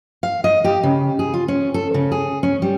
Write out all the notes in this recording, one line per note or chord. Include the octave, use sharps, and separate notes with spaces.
F5
D#5
G4
C#3
G#4
F4
C#4
A4
C#3
G#4
C#4
G3